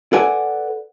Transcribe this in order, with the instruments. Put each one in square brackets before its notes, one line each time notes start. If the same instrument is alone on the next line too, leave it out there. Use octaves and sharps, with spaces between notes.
[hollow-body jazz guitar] A4 B4 D5 F#5 G#5